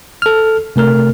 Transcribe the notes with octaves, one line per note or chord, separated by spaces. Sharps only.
A4 F6
C3 A3 A#4 F6